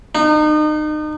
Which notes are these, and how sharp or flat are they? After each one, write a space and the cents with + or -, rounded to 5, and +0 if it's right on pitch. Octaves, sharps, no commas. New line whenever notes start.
D#4 -35